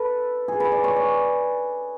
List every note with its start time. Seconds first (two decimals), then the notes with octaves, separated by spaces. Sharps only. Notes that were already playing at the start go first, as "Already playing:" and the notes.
Already playing: A4 B4
0.48 G#4
0.60 B4
0.72 D5
0.84 C#5
0.96 D5